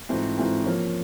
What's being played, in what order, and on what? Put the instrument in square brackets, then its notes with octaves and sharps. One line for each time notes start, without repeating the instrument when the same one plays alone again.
[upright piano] G#2 E3 A3 C4 F4
G#2 E3 A3 C4 F4
F3 A#3 C#4 F4